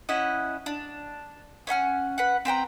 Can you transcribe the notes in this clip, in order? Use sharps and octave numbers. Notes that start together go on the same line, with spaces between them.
C#4 E4 D#5 F#5
D4
C#4 E5 F#5 F6
B4 F#5
C4 B4 G5 A#5